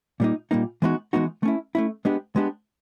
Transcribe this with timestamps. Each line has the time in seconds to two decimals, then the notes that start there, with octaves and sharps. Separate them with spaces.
0.20 A#2 G3 A#3 D#4
0.51 A#2 G3 A#3 D#4
0.82 E3 G#3 B3 D#4 F#4
1.13 E3 G#3 B3 D#4 F#4
1.43 A3 C#4 E4
1.75 A3 C#4 E4
2.05 G#3 B3 D4 G4
2.36 G#3 B3 D4 G4